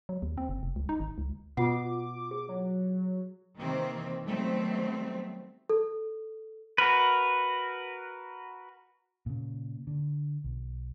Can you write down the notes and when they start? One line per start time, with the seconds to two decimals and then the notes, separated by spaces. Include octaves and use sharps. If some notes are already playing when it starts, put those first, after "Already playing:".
0.09 F#3
0.22 D#2
0.38 C4
0.49 F#1
0.63 F1
0.76 C#2
0.89 D#4
1.00 G#1
1.18 C#2
1.57 B2 F4 F#5 D6
2.31 G#4
2.49 F#3
3.59 C3 D#3 E3 A#3 C4
4.24 D#3 F#3 G3 A3 B3 C4
5.70 A4
6.78 F#4 A#4 B4
9.26 A#2 C#3
9.87 D3
10.44 B1